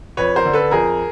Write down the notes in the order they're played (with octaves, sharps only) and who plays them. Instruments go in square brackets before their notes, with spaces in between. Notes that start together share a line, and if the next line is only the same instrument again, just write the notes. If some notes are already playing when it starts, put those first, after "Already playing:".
[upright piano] F2 B4 C#5
A#4 C5
D3
A4 B4
F2 G#4 A#4